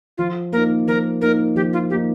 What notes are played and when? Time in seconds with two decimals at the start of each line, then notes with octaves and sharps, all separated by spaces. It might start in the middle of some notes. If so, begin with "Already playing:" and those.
0.18 F3 F4
0.52 A#3 D#4 A#4
0.88 F3 A#4
1.21 A#3 D#4 A#4
1.56 F3 G4
1.73 F4
1.90 A#3 D#4 G4